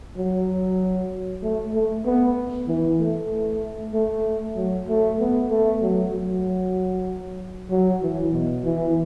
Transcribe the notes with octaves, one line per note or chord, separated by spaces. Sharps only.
F#3
A3
A3
B3
E3
A3
A3
F#3
A3
B3
A3
F#3
F#3
F#3
E3
B2
E3